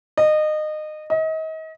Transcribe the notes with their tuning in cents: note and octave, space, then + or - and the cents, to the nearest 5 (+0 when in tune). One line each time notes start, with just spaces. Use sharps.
D#5 -25
D#5 +35